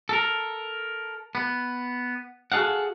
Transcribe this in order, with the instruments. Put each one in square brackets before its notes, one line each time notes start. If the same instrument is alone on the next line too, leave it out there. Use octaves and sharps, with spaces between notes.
[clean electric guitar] A4 A#4
B3
F#4 G#4 A4 F5 F#5